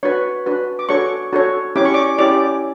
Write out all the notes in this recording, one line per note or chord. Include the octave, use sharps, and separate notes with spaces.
D4 F#4 B4 C#5 C#6
D4 F#4 B4
D6
D4 F#4 A4 C#5 C#6
D4 F#4 A4 C#5
C#4 E4 G4 C#5 D6
C#6
D5 D6
C#4 E4 G4 C#5 D5 D6